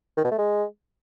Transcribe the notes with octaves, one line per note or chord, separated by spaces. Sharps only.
D#3
B2
A3
G#3